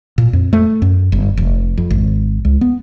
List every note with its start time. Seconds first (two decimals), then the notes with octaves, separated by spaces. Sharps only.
0.18 A#2
0.33 F2
0.53 A3
0.82 F#2
1.12 G1
1.37 F1
1.78 F2
1.90 G#1
2.45 C#2
2.61 B3